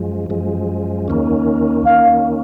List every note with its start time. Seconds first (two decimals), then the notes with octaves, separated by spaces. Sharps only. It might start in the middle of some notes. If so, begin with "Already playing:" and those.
Already playing: F#2 F3 G#3
0.30 F#2 F3 G#3
1.08 D#2 D#3 A#3 C#4
1.86 D#2 D#3 A#3 C#4 F5